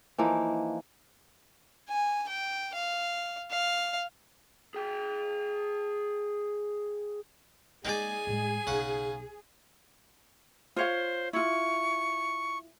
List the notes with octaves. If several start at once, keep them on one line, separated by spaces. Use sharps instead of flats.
E3 F3 A#3 D#4
G#5
G5
F5
F5
G#4 G5
G#3 A#3 D#4 G#4 D5 G#5
A2 G#3
B1 C#3 D#4 F#5
F4 C5 C#5 F5
E4 F4 C#6